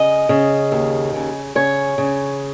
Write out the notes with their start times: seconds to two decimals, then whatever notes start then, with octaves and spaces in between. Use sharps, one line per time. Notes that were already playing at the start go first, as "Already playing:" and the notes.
Already playing: C#3 D#5
0.29 C#3
0.72 D#2
1.14 C#3
1.55 C#3 C#5
1.98 C#3